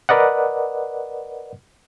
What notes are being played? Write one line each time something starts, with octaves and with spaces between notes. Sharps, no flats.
A#4 B4 D5 D#5 F#5